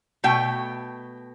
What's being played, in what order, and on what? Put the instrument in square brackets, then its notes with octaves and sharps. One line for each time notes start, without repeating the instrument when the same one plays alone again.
[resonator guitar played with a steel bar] B2 A3 G5